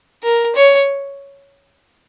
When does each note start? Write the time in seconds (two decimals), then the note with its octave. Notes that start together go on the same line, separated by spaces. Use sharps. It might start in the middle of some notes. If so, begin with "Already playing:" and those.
0.23 A#4
0.55 C#5